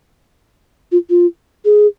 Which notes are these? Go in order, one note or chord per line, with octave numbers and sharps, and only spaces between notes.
F4
F4
G#4